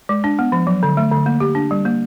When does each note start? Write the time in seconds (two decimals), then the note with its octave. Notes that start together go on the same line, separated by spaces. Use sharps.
0.09 G#3
0.24 D4
0.39 B3
0.52 F3
0.67 F#3
0.83 D3
0.97 A3
1.11 D3
1.26 A#3
1.40 G4
1.55 D4
1.71 G3
1.85 A#3